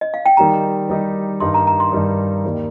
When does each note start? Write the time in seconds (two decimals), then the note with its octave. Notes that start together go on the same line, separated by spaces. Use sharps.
0.01 D#5
0.14 F5
0.26 G5
0.37 D#3 G3 D#4 G4 A#5
0.90 D#3 G3 D#4 G4
1.40 G2 D#3 G3 D#4 C6
1.54 A#5
1.67 A#5
1.80 C6
1.92 G2 D#3 G3 D#4
2.45 D#2 D#3 G3